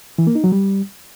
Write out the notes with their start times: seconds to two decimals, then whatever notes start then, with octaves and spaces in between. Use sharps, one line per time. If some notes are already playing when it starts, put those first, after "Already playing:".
0.18 E3
0.27 A#3
0.35 D#4
0.44 F#3
0.52 G3